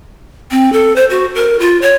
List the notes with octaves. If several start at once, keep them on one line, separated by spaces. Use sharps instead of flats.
C4
A4
C5
F#4
A#4
F4
C#5